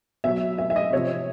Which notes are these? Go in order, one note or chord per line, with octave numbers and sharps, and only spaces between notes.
B2 F#3 E5
E5
E5
D#5
C3 F3 C#5